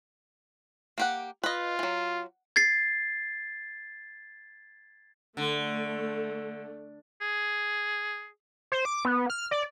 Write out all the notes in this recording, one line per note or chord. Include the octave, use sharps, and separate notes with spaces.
A#3 G4 F#5
F4 B4 D#5
E3 F#3
G#6 A6 C7
D3 A3
G#4
C5
D6
B3
F6
D5